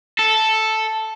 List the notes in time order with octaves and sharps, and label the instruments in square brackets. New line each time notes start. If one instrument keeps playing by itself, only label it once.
[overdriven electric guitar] A4